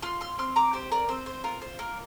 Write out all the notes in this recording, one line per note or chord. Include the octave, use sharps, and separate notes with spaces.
F4 C6 F6
C6 F6
C4 C6 F6
A#5 D6
G4 C5
A#4 D5
C4 C5
C5
F4 A#4
C5
A#3 A#4